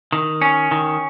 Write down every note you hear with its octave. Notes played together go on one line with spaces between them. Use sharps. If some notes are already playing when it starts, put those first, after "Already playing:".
D#3
C#4
D#3